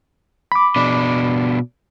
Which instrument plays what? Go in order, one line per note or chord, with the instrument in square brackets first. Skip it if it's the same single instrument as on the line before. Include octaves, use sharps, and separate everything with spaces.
[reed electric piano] B5 D6
[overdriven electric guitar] B2 D4